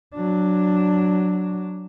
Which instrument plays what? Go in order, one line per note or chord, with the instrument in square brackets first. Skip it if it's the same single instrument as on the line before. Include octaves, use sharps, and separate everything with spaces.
[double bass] F#3 D4